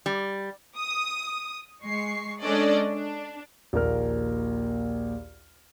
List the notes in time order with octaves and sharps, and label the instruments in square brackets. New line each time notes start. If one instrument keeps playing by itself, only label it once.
[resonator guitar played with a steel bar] G3
[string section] D#6
G#3 C#6 C7
G#3 C#4 D4 A4 D5 D#5
D4
[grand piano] A#1 D#2 A#4 F6